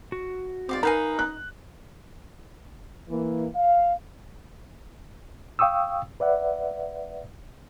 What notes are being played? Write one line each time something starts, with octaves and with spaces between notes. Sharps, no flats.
F#4
E2 G#2 C4 D5 F5 D6
D#4 A#4 B4 F5 G#5 A#5 G6
F#6
E3 A#3
F5
F5 G5 C#6 D#6 E6
B4 D5 E5 F#5